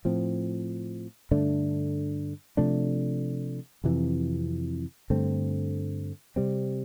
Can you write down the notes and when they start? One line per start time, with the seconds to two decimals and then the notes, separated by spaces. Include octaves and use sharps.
0.05 A2 F3 C4
1.31 G2 D3 A3 D4
2.57 C3 F3 A3 D4
3.84 F2 C3 E3
5.10 G2 D3 A3 C4
6.36 C3 G3 C4